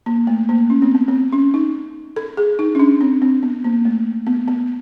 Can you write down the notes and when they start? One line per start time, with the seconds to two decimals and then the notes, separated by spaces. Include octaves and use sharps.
0.06 A#3
0.27 A3
0.49 A#3
0.70 C#4
0.82 C4
0.95 B3
1.08 C4
1.32 C#4
1.54 D#4
2.16 A4
2.37 G#4
2.59 D#4
2.75 C#4
2.79 D4
3.01 C4
3.22 C4
3.43 B3
3.64 A#3
3.85 A3
4.27 B3
4.48 B3